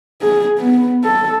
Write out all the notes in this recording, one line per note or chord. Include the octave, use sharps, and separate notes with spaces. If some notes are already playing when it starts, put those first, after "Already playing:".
G#4
B3
A4